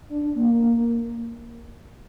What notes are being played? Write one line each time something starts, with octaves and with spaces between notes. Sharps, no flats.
D4
A#3